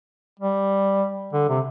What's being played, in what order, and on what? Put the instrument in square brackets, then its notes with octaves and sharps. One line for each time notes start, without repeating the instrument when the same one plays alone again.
[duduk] G3
D3
C3